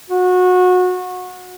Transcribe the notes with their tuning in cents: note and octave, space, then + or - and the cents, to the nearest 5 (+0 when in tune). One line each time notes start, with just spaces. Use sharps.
F#4 -25